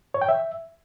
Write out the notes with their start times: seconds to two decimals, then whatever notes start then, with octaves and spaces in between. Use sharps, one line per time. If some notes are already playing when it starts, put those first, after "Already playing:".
0.14 C#5
0.22 G5
0.29 E5